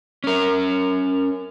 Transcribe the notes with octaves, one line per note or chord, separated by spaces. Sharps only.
C#4 A#4